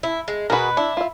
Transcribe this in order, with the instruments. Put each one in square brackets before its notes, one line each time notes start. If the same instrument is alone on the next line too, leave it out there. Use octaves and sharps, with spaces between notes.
[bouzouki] E4
G#3
[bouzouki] B2 B4 [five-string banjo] F#4 G#4 A#4
[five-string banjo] D4 [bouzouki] E4
[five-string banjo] F4 E5